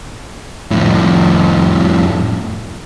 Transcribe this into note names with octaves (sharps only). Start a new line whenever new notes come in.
F2 A2